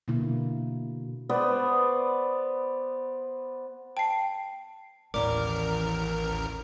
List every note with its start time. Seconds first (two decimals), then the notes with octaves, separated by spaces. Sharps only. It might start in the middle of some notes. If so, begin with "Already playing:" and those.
0.08 B2 D3 A#3 E4
1.29 B3 B4 C5 D5
3.97 G5 A5 C7
5.14 A1 D#2 A#4 D5 D6